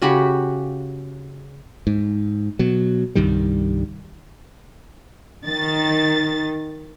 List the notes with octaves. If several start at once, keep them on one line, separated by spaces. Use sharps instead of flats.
C#3 F#4 G4 B5
G#2
B2 F#3
C2 G2 D#3 G3
D#3 A6